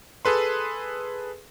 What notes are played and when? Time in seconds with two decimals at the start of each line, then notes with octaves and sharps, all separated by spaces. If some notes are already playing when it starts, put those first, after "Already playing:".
0.25 G#4 A4 B4 C6